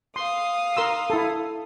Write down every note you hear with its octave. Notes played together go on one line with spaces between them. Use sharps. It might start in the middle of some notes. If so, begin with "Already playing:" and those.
F5 C6 D#6
A#4 C6 E6
E4 A4